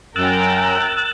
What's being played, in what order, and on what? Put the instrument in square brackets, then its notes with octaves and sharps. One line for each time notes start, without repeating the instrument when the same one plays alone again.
[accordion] F#2 [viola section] A#4 G5 A#5 [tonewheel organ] E6 F#6 A6